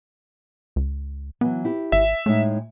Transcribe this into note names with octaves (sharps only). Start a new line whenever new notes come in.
C#2
E3 F#3 B3
E4 G4
G#1 E5
A2 G#3 A3 D#4